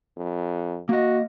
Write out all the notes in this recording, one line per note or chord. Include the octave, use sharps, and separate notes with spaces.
F2
A#3 F#4 D#5